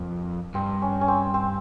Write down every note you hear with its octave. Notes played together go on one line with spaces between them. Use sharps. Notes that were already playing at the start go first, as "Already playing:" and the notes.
Already playing: F2 A#3
G2 C4
C#4
C#4
C4
C4